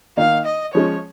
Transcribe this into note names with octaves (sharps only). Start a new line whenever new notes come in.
D#3 A#3 D#4 F5
D#5
F3 G#3 C#4 C#5